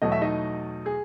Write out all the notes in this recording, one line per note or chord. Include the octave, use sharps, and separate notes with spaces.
E2 B2 F#3 A3 D#5
E5
D#4 D#5
G#4